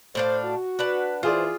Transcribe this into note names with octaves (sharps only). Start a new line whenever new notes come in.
A2 D4 C5 F5
F#4
D4 B4 F#5
E3 F4 G#4 C5 D5